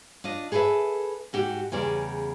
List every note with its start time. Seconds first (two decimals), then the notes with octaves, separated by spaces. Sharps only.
0.24 D4 F4 D#5
0.52 G#4 A4 B4 D5 E5
1.33 G#2 F#4 G4
1.72 E2 C#3 G3 D5